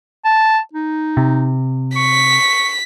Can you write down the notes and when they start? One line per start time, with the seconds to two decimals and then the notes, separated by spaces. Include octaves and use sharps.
0.24 A5
0.73 D#4
1.17 C3
1.96 C#6 B6